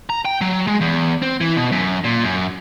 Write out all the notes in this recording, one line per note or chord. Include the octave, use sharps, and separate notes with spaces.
A#5
G5
F#3
G#3
E2
C4
E3
B2
F#2
A#2
F#2